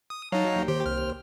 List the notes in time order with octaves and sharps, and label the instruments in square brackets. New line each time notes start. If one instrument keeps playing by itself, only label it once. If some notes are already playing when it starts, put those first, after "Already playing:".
[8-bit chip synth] D#6
[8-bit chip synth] F#3 D#4 [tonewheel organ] C#5 F5 A#5 [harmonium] A5
[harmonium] D#2 G5
[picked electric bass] D#3 [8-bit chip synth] G4 [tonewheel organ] C5
[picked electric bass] C2 [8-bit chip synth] F6